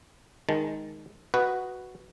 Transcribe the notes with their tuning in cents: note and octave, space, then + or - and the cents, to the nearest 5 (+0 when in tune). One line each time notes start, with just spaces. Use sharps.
D#3 +0 G#3 +0 A5 -5
F#4 +0 B4 +0 D#5 +0